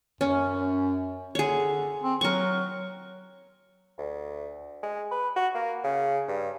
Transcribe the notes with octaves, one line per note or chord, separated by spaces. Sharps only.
F#2 C#4
D3 G#4 C#5
C4
F#3 A#4 C#6
D2
G#3
B4
F#4
A#3
C#3
G2